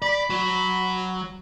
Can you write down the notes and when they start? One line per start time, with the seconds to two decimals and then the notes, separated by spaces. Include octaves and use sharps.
0.02 D5 B5
0.30 F#3